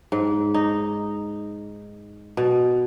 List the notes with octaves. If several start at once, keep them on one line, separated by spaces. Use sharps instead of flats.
G#2
D#4
B2